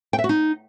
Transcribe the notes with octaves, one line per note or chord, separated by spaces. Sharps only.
G5
E5
F#4
D#4